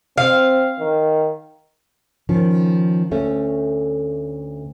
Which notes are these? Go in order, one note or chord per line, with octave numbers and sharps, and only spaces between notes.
C4 F5
D#3
D#3 F3 C#4
D2 A3 C#4